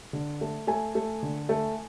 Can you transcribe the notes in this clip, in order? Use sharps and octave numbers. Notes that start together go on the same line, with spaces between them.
D3
A3
A3 G#5
A3
D3
A3